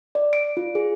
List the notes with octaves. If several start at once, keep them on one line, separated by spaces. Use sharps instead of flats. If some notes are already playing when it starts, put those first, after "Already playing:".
D5
D7
F4
G#4